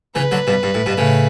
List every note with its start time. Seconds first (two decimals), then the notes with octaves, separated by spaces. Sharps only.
0.15 C#3 E3 B4
0.31 D3 F#3
0.47 G2 B2
0.63 G2
0.74 A2
0.86 G2 B2
0.98 A2 C#3